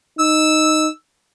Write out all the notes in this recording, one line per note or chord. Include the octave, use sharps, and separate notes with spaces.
D#4 E6